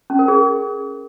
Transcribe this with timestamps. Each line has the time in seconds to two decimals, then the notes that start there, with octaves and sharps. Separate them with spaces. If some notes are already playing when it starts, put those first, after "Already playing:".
0.10 C#4
0.19 A#4
0.28 G#4